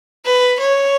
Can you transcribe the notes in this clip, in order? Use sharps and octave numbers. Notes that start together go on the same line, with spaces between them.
B4
C#5